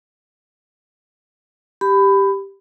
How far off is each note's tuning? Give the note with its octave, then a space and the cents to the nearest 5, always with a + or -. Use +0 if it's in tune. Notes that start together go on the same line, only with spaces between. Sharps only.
G4 +0 B5 +20